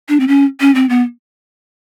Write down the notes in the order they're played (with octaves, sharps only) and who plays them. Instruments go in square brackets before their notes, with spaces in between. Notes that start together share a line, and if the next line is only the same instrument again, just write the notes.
[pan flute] D4
C4
C#4
C#4
C4
B3